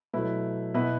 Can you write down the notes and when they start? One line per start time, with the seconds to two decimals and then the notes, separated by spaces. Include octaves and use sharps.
0.13 B2 F#3 A3 E4 B4
0.74 B2 B3 E4 B4